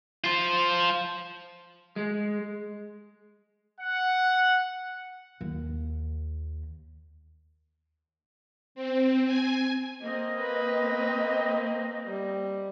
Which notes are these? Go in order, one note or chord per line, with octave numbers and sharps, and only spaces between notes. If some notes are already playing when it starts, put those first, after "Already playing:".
F4 C5
G#3
F#5
D#2
C4
G#5
A#3 C4 D#5
B4
G3